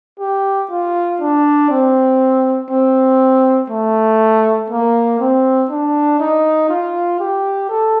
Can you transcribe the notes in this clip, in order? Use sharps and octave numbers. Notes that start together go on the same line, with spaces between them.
G4
F4
D4
C4
C4
A3
A#3
C4
D4
D#4
F4
G4
A4